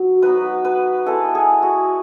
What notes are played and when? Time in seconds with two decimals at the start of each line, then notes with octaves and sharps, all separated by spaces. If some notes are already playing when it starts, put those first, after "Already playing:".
Already playing: F#3
0.22 F#3 B3 D#4 B4
0.65 B4
1.06 G#3 B3 E4 A4
1.35 G#4
1.62 F#4